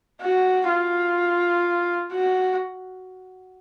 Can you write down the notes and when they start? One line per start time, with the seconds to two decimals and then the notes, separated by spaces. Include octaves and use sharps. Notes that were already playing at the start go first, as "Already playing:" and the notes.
0.21 F#4
0.68 F4
2.12 F#4